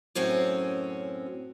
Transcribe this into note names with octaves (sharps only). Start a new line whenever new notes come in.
F#2 A2 C4 C#4 F#4